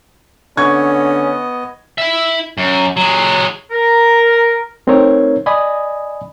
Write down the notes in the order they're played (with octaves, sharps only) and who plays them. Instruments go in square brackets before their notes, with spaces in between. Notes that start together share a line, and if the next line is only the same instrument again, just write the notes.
[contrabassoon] D3 [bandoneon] B3 D#5 [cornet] C#4 [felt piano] C#6 G#6
[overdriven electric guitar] E4 E5
F#2
F#3 G#3
[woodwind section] A#4
[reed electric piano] A3 C4 D#4 A#4 C#5
D5 D#5 G#5 B5 D#6